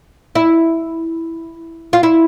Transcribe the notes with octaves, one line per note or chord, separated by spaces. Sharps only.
E4
F4
E4